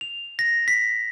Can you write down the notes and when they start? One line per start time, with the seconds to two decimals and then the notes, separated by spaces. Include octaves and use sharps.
0.01 F7
0.39 A#6
0.68 B6